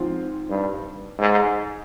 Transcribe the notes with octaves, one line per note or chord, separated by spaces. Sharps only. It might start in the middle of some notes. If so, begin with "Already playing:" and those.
Already playing: G#2 F3 C4 F4
G2
G#2